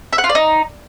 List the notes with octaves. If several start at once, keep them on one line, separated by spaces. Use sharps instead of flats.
E5
F#5
F4
D5
D#4